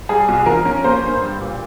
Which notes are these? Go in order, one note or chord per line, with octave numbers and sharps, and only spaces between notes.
G3 G#4
C2
F3 A#4
C#4
A#3 C5
G2
G3
A#2